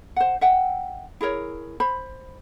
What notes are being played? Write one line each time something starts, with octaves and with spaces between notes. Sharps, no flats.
C5 F#5
E5 F#5 G5
E4 G#4 A#4 C#5
C5 B5